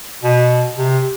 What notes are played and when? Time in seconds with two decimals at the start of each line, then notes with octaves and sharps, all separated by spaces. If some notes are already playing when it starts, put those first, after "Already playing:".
0.23 B2
0.78 C3